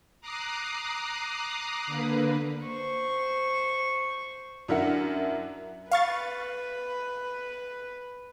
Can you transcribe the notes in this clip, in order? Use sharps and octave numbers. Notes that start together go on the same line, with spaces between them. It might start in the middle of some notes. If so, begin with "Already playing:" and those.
A#5 D6 D#6 F#6 C7
D3 A#3 B4
C5 C#6
F#2 D4 E4 A#4 E5 F#5
B4 F5 C#6 A6